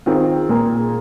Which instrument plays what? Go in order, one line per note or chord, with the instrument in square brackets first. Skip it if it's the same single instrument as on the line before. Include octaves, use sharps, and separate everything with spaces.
[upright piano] D#3 C4 F4 G#4
A#2 A#3 G#4